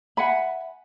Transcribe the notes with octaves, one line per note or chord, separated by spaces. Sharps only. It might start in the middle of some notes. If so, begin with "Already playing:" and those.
E5 F#5 G#5 B5